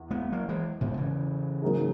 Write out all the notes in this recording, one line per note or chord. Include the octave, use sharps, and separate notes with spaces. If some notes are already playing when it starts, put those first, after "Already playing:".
Already playing: E2
G#3 B3
F#3 A#3
E3 G#3
G#2 B2
C#3 E3
G#2 F#3 A#3 D#4 G#4